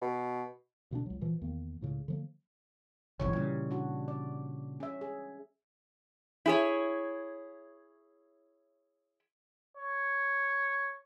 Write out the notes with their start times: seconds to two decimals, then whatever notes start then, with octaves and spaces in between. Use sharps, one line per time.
0.02 B2
0.91 D2 B2 A#3 D4
1.06 C#2 F#3
1.21 A#2 E3 F3
1.42 E2 D#3 A#3
1.81 C#2 A2 C#3
2.08 D3 F3 A#3
3.20 F#1 B1 F2 E3 C#5
3.33 A#2 C#3 G3
3.71 D4 F#4
4.08 D5
4.80 C#4 E5
5.01 G#4
6.46 E4 G#4 C#5
9.77 C#5